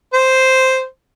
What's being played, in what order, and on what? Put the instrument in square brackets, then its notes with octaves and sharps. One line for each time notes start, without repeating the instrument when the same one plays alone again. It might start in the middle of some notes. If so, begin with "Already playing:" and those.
[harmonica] C5